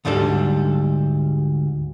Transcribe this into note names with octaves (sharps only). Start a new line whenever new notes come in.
D2 G#2 G3 D4 A4